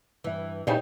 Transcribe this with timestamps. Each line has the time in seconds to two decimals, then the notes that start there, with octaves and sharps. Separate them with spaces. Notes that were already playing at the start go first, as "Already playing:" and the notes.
0.24 G2 E3 E5
0.67 G2 A#2 C#3 D#4 E4 G4 C5